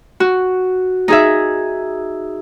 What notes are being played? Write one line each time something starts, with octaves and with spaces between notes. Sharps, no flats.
F#4
D#4 G#4 E5